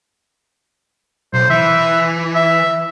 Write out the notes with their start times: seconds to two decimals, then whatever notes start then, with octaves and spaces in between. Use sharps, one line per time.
1.34 B1 C5
1.50 E3 E5
2.35 E5